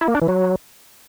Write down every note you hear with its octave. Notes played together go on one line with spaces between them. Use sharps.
E4
A#3
D4
E3
F#3